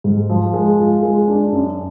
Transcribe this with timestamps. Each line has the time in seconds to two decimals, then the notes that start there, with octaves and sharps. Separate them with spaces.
0.04 G#2
0.29 F3
0.54 G#3
0.79 F4
1.03 G#3
1.28 D4
1.52 F#2